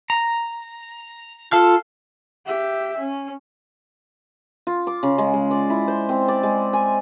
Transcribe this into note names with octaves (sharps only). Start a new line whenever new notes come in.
A#5
F4 A4 F5 A5 F6
G4 E5
C#4
F4
D6
C#3
G#3
G#3
D5
E4
C5
C4
D5
G#3
G#5